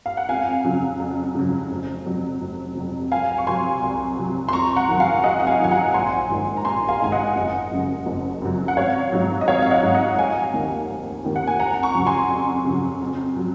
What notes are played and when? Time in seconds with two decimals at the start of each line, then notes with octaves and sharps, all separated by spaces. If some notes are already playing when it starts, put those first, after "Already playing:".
0.06 F5
0.17 F#5
0.29 F2 F5 G#5
0.65 C#3 F#3
1.00 F2
1.35 C#3 F#3
1.71 F1
2.06 F2 C3 F#3
2.41 F1
2.77 F2 C3 F#3
3.12 C2 F5 G#5
3.38 C#6
3.47 C3 F#3 G#5 C6
3.82 C2
4.18 C3 F#3
4.49 C6
4.53 F2 A#5 C#6
4.76 F#5 A#5
4.89 D#3 F#3
5.00 F5 G#5
5.23 F2 D#5 F#5
5.40 F#5
5.47 F5 G#5
5.59 D#3 F#3 G#5
5.71 F#5 A#5
5.94 A#1 G#5 C6
6.30 G#2 D#3 G#3
6.57 A#5
6.65 A#1 G#5 C6
6.88 F5 G#5
7.00 G#2 D#3 G#3 G#5
7.12 D#5 F#5
7.36 F#1
7.71 F#2 C#3 F#3
8.06 F#1
8.42 F#2 C#3 F#3
8.68 F#5
8.76 G#1 C#5 F5
9.12 G#2 F#3
9.41 D#5
9.48 G#1 C#5 F5
9.62 F5
9.71 D#5 F#5
9.83 G#2 F#3
9.94 D#5 F#5
10.18 F1 F5 G#5
10.53 D#2 D#3
10.89 F1
11.24 D#2 D#3
11.36 F#5
11.47 G#5
11.59 F2 F#5 A#5
11.83 A#5 C#6
11.95 C#3 F#3
12.07 G#5 C6
12.30 F2
12.65 C#3 F#3
13.01 F2
13.36 F#3